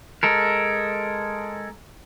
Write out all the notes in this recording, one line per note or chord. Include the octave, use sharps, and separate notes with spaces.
G#3 A4 A#4